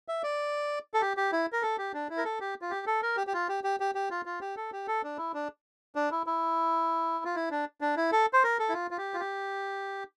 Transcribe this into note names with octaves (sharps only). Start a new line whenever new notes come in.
E5
D5
A4
G4
G4
E4
A#4
A4
G4
D4
E4
A#4
A4
G4
F4
G4
A4
A#4
G4
G4
F4
G4
G4
G4
G4
F4
F4
G4
A4
G4
A4
D4
E4
D4
D4
E4
E4
F4
E4
D4
D4
E4
A4
C5
A#4
A4
E4
F4
F4
G4
F4
G4